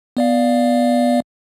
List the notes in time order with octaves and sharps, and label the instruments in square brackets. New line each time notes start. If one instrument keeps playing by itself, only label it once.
[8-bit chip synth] B3 D5 F5